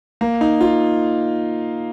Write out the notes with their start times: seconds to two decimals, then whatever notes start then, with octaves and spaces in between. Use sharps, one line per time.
0.21 A#3
0.41 D#4
0.61 F4